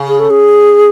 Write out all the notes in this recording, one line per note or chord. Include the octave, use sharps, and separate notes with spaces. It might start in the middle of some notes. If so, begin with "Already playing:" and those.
Already playing: C#3
G#4
A4
G#4